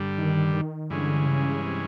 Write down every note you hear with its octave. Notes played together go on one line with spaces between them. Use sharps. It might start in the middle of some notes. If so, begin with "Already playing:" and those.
Already playing: G2 D3 G3
D#3
D#3
G2 D3 E3 G#3 C#4
C#3
C3